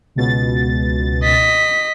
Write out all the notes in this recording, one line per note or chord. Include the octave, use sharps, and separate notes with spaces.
C#2 B2 A6
D#5 B6